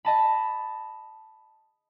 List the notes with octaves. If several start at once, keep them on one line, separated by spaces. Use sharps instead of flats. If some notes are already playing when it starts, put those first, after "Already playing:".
D#5 A5 B5